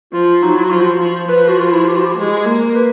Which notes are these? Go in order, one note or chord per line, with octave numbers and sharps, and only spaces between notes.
F3 F4
F#3 D#4
E4
F#4
F3 F4
F#4
F3
F3 B4
F#4
F4
E4
G4
F#4
G4
G#3
A#3
B4